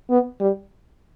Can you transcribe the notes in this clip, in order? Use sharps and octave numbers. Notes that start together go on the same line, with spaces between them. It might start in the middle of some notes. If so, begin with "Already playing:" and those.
B3
G3